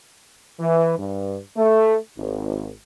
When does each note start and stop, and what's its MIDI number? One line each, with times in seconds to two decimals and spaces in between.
0.60 0.96 52
0.98 1.38 43
1.56 1.96 57
2.17 2.72 32